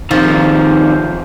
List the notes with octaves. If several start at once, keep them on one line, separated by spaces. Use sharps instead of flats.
C3 D#3 F3